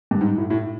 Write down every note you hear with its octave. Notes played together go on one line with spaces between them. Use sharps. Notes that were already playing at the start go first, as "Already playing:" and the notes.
G2
G#2
A2
A2